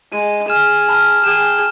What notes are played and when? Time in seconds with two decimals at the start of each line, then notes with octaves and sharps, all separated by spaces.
0.12 G#3 D#7
0.48 G#4 F6 E7
0.89 A5 B5 F6
1.24 G#4 G5 E7